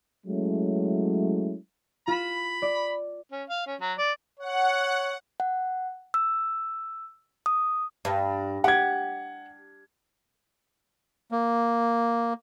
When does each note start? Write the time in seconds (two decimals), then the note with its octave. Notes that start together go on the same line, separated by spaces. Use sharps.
0.26 F#3 G#3 A3 C#4 E4
2.08 F4 B5 E7
2.62 D5
3.31 C#4
3.49 F5
3.67 C#4
3.80 F#3
3.98 D5
4.40 C#5 F#5
5.40 F#5
6.14 E6
7.46 D#6
8.05 G2
8.64 G4 F#5 G#6
11.32 A#3